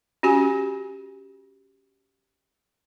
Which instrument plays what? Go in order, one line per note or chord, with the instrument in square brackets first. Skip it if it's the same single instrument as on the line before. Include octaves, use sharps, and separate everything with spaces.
[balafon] C#4 F#4 G4 G#5